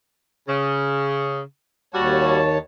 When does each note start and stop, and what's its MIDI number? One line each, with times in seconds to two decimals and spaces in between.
0.48 1.40 49
1.94 2.58 39
1.94 2.40 55
1.94 2.40 66
1.94 2.58 73
1.94 2.58 81